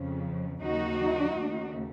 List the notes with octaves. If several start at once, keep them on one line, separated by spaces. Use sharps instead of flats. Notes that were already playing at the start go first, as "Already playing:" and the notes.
Already playing: F2 C#3 F3
D#2 C#3 F#3 D#4 F#4
D#2 C#3 A3